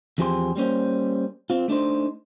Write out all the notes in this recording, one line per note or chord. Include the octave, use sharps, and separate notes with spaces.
E2 F3 C4 G4 G#4 C6
G3 A#3 C#4 C5
C4 F4
A3 D4 D#4 C5